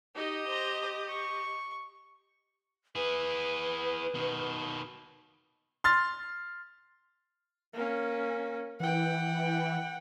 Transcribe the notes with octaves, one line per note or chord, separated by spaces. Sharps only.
D#4 G4 D#5
C5 A#5
C#6
E4 G#4 B4
B2 D#3
C6 F6 A6
A#3 C#4
E3 F#5 G5